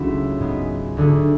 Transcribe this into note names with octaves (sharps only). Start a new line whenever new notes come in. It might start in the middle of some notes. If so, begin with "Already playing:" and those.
Already playing: C#2 F#3 A3 D4 E4 F#4
G#2 G#3 B3
D2 D3 A3 D4 G#4